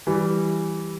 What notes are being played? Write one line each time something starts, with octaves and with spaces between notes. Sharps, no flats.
E3 G3